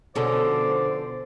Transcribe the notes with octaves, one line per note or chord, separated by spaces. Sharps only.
B2 D3 F3 C#4 A4 C5 D5